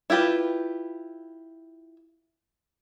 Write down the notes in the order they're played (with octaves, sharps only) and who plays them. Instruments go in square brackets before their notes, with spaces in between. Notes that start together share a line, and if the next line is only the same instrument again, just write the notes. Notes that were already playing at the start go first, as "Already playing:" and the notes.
[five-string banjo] E4 F4 G4 B4